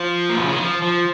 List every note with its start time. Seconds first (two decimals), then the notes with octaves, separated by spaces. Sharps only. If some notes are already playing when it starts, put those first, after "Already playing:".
Already playing: F3
0.29 A#2
0.37 B2
0.45 C#3
0.53 D#3
0.61 F3
0.82 F3